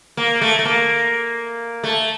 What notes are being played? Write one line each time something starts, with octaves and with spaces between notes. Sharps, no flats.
A#3
A3
A3
A#3
A3